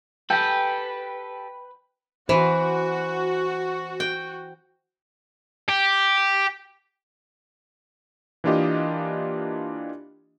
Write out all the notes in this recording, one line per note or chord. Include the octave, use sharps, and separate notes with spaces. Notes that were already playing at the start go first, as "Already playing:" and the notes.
G4 A4 B4 G5
E3 F#4 C5
G5
G4
E3 A#3 D4 F4 G4 D#5